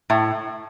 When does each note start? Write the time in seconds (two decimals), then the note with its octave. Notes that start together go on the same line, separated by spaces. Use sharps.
0.10 A2